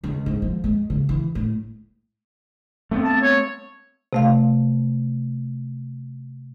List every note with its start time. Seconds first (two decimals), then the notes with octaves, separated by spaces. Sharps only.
0.04 C#2
0.26 G#2
0.42 F3
0.64 G#3
0.90 C#3
1.09 E3
1.35 A2
2.91 A3 B3 C4
3.05 A5
3.22 C#5
4.13 C3 A3 F5